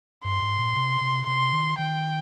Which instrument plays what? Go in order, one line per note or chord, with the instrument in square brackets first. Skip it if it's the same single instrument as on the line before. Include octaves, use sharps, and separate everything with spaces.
[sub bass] G2 [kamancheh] C6
[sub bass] G#2
A#2
C3
C3
[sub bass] C3 [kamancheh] C6
[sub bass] D#3
[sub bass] D#3 [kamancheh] G5